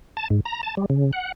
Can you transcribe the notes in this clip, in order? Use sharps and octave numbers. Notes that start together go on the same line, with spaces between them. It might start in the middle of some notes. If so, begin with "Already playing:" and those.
A5
G#2
A#5
A5
G3
C#3
F#5